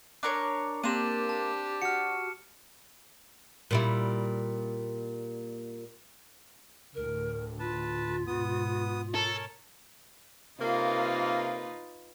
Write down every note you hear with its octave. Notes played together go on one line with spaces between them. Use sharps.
D4 A#4 C#5 D6
A#3 C4 D4 G4 D#7 E7
A5
F#4 F6 C#7
A#2 G3 E4
D2 A2 D3 A#4
F4 B4 A5
G#2 B2 B3 D#6
A4 A#4 C#5 A5
C3 A#3 D#4 F4 B4